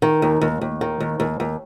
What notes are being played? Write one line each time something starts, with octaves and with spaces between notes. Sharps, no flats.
D#3
D#2
D#2
D#2
D#3
D#2
D#2
D#2